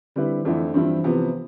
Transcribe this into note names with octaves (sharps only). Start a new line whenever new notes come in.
D3 G3 C4 E4 B4
F2 D3 E3 A3 E4
G2 E3 F3 C4 E4
C3 F3 B3